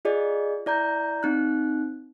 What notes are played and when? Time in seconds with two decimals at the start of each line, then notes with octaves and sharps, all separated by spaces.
0.05 F4 G#4 D5 D#5
0.66 E4 D5 A#5 G6
1.23 C4 D#4 F#6